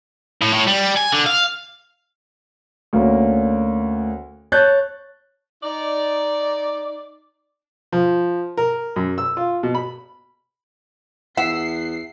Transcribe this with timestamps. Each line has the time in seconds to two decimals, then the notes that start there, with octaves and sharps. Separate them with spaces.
0.41 A2
0.53 A2
0.67 G3
0.96 G#5
1.12 D3
1.26 F5
2.93 D2 A#3 C#4
4.52 C#5 A5 F#6 G6 A6
5.63 D#4 D5
7.93 F3
8.57 A#4
8.96 F#2
9.18 E6
9.37 F4
9.63 B2
9.75 B5
11.37 E2 E5 F#5 C7